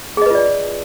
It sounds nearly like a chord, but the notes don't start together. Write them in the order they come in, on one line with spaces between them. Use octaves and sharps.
G#4 D#5 B4 F4 D5